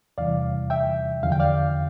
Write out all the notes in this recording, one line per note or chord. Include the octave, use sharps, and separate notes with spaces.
E2 C3 E3 G3 D5 F5
E5 G5
E2 D3 F3 F5
G5
D5 F5